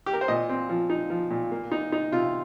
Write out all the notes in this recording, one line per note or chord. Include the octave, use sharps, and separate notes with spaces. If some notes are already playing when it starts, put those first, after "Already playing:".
G4
A#4
C5
A#2 D#5
C4
F3
D#4
F3
A#2
A#3
D#4
D#4
C3 F4